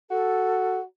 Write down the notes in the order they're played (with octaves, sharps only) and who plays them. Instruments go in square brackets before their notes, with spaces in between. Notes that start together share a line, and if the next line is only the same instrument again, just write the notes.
[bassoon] F#4 [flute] A4